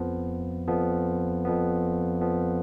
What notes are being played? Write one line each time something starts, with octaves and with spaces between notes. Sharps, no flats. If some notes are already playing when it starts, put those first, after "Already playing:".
Already playing: F2 F3 B3
F2 F3 B3
F2 F3 B3
F2 F3 B3